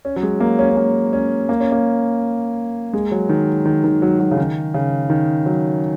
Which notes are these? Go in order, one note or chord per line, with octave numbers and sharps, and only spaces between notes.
C#4
F#3
G#3
A#3
C#4
C#4
A#3
C#4
A#3
C#4
A#3
G#3
F#3
D#3
D#3
D#3
F#3
F#3
C#3
D#3
C#3
D#3
F#3